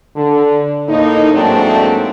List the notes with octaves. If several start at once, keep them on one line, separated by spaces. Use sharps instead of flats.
D3
A2 A#3 D#4
G#2 F#3 A3 A#3 C4 D4